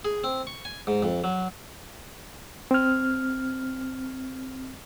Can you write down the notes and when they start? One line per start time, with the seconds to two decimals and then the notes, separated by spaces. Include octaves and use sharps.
0.05 G#4
0.24 C4
0.47 C#6
0.65 G#5
0.87 G#2
1.03 F2
1.24 F#3
2.71 C4 F6